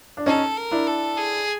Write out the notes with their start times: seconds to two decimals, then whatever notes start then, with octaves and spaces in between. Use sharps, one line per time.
0.17 D4
0.26 C#4 D#4 A4
0.57 A#4
0.71 D4 E4
0.87 A4
1.17 G#4